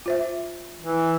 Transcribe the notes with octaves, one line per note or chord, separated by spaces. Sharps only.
F4 C5 E5
E3